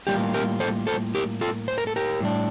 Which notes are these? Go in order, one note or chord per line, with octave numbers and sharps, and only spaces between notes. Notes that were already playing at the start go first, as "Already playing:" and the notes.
A2 G3 A#3 F4 G4
G4 A#4
A4 C5
A4 C5
G4 A#4
F4 A4
C5
A#4
A4
G4 A#4
A2 G3 D4